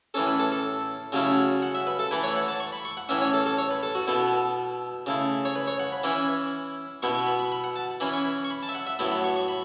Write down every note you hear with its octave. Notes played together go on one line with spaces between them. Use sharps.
A2 E3 C#4 A4
B4
A4
A4
C#3 F#3 A3 C#4 E4
F#5
E5
B4
A4
E3 A3 E4 B4
C#5
F#5
A5
C#6
B5
C#6
F#5
A2 E3 C#4 E5
C#5
A4
A4
C#5
B4
A4
F#4
B2 B3 E4 A4
C#3 A3 E4
C#5
B4
C#5
F#5
B5
E3 C#4 E4 B5
B2 B3 E4 C#6
C#6
B5
B5
B5
F#5
A5
E3 C#4 E4 B5
C#6
B5
C#6
B5
A5
E5
F#5
E5
A2 F#3 B3 E4 B5
B5
C#6
C#6
B5